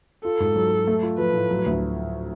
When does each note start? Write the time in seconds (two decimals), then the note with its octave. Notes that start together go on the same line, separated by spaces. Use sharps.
0.24 F4 A4
0.40 G#2
0.55 F#3
0.72 F#3
0.87 A3
1.03 F4
1.18 F3 B4
1.34 A2
1.51 F#3
1.66 D2